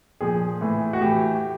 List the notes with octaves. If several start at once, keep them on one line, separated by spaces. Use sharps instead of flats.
A#2 F3 G#4
A2 E3
F#4
A2 E3 G4